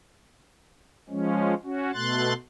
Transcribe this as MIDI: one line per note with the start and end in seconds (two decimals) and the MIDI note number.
1.09 1.54 53
1.09 1.54 56
1.09 1.54 61
1.64 1.91 61
1.64 1.91 66
1.94 2.33 47
1.94 2.33 57
1.94 2.33 84
1.94 2.33 90
1.94 2.33 93